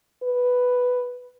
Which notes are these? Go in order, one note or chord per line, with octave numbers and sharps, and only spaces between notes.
B4